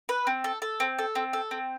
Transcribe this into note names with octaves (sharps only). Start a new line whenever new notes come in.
B4
C4
A4
A4
C4
A4
C4
A4
C4